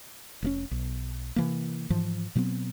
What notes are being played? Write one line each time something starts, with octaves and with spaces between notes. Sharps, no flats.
F1 A#2 C#4
B1
C3 E3 A#3
G#2 E3 F3
B2 F#3 B3 C4